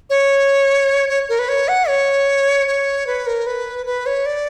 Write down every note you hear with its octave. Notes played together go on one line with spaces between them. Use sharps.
C#5
C#5
A#4
B4
C#5
F#5
C#5
C#5
B4
A#4
B4
B4
C#5
D5